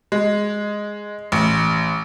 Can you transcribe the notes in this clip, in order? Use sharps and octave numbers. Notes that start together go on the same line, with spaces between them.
G#3
A1